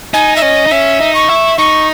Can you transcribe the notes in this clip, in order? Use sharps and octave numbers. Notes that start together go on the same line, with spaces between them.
D#4 G#5
E5
C#4 D#5
D#4
C#4 E5
D#4
C#6
E4
D#4 C#6